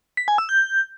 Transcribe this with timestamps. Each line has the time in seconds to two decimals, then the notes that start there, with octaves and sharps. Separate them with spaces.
0.17 B6
0.28 G#5
0.38 E6
0.49 G6